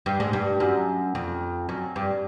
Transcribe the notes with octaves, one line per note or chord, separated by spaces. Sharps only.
G2
G#2
G2
F#2
F2
F#2
G2